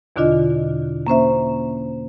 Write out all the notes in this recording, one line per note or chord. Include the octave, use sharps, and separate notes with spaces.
E2 B2 D3 D4 F4 D#5
A#3 C#4 C5 E5